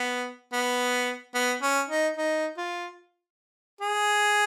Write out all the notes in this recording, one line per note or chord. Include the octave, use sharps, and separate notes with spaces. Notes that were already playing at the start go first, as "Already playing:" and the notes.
Already playing: B3
B3
B3
C#4
D#4
D#4
F4
G#4